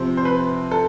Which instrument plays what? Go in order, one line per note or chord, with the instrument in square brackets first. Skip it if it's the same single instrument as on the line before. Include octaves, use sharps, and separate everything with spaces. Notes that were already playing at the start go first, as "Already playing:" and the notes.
Already playing: [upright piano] C3 F3 C4 [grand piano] C5
[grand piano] C5
B4
A4